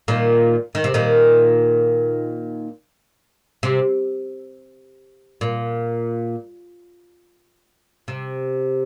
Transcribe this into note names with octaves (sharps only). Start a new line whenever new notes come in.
A#2 D#3
D#3
C3
A#2 D#3
C3
A#2
C3